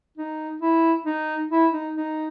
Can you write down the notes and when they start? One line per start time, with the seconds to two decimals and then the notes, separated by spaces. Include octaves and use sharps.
0.18 D#4
0.62 E4
1.06 D#4
1.51 E4
1.73 D#4
1.96 D#4